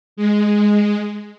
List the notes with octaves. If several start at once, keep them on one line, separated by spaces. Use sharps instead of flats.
G#3